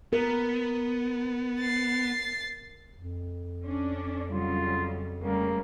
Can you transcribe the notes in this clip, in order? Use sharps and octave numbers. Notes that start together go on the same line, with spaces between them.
B3 A#4
A6 C7
F2
C#4 D4 D5
C#3 F#3 G3 F4
C#3 G3 A3 A#3